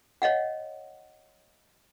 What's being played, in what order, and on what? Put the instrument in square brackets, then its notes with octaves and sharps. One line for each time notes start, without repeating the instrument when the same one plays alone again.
[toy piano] C#5 D#5 F5 F#5